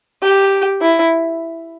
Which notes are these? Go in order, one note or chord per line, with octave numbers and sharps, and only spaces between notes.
G4
E4